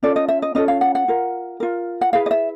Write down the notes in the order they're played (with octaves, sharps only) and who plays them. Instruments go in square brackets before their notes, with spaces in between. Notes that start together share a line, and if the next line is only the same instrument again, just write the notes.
[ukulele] C#4 F4 A4 D5
D#5
E5
D#5
C#4 F4 A4 D#5
F5
F#5
F#5
F4 A#4
F4 A#4
F#5
E4 G#4 B4 F5
D#5
E5